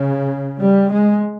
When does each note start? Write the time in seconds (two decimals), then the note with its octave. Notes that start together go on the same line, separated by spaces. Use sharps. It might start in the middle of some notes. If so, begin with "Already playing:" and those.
Already playing: C#3
0.60 G3
0.89 G#3